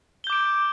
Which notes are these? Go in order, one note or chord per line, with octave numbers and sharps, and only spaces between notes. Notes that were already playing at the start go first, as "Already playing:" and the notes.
D6 G6 D7 G7